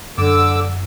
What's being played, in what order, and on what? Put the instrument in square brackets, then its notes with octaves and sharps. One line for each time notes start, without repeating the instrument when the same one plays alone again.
[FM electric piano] F#2 [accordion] D3 D6 E6